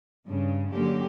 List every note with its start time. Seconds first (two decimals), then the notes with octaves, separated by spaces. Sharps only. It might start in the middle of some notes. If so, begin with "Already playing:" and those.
0.25 G2 C#3
0.73 D3 F#3 A#3 C#4 G4